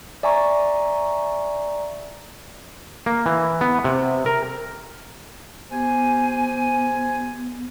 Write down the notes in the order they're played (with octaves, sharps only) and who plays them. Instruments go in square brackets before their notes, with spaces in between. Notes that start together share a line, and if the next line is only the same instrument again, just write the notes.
[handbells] D5 E5 G#5 A#5 C#6
[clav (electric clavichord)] A#3
E3
B3
C3
A#4
[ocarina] B3 [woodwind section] G4 C5 G#5